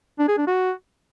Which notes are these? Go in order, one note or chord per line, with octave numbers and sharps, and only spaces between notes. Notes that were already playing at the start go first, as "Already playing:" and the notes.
D4
G#4
D4
F#4